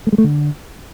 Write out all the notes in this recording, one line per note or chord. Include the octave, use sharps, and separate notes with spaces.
A3
G#3
A3
D3